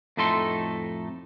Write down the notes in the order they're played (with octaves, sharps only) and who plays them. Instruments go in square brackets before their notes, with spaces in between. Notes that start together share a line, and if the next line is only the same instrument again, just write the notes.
[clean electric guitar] F2 A2 A3 D#4 A4 C6